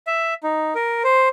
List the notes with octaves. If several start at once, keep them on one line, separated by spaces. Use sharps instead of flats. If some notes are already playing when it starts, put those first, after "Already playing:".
E5
D#4
A#4
C5